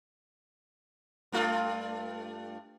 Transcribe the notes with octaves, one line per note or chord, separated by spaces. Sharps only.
G2 A3 F4